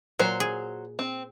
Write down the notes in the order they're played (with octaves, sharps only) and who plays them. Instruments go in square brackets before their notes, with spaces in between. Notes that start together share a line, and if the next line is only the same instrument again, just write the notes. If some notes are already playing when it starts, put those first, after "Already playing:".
[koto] A#2 [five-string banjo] F#3 C5
[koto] G#4
[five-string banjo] C4